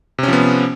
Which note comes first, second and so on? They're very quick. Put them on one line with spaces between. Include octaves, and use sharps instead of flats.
C3 C#4 F3 B3